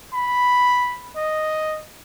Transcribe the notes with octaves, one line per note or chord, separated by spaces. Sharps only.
B5
D#5